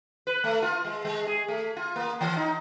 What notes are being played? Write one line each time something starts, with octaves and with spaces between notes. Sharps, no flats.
B4
A3
F4
G#3
G#3
G#4
A3
F4
A#3
E3
D#4